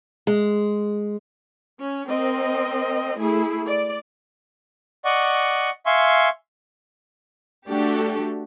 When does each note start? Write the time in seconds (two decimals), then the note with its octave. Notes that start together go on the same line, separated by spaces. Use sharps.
0.27 G#3
1.79 C#4
2.09 C4 A#4 D#5
3.18 A3 E4 G#4
3.66 D5
5.05 D5 D#5 F#5 C#6
5.86 E5 F5 G#5 C6 C#6
7.68 A3 D4 F#4 G4 A4